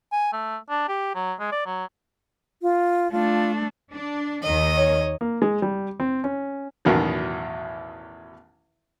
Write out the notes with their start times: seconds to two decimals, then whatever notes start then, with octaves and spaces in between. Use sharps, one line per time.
0.12 G#5
0.33 A3
0.70 D4
0.89 G4
1.15 F#3
1.40 G#3
1.52 D5
1.66 F#3
2.62 F4
3.12 A3 D4 F4
3.92 D4
4.43 D#2 D#3 D#5
4.77 C#5
5.21 A#3
5.42 G#3
5.62 G3
6.00 C4
6.24 C#4
6.85 A1 E2 B2 D#3 F#3